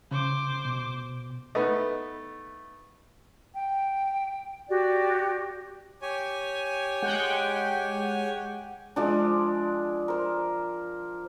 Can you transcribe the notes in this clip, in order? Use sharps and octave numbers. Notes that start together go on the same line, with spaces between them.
C#3 C5 D6
B2
A3 B3 D#4 B4 D#5
G5
F#4 G4 D5
G4 C#5 G#5
G#3 F#5 G5
F3 G#3 D4
A#4 C5